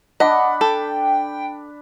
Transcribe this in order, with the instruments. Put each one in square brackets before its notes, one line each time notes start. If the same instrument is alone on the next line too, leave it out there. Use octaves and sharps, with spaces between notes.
[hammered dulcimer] D4 B5 D6 [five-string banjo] D#5 [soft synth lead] F#5
[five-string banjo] A4 [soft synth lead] G5